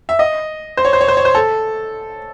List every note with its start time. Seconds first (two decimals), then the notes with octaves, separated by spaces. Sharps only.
0.09 E5
0.19 D#5
0.77 C5
0.85 C#5
0.93 C5
1.01 C#5
1.08 C5
1.17 C#5
1.25 C5
1.35 A4